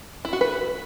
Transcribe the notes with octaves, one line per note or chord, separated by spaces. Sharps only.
E4
F#4
B4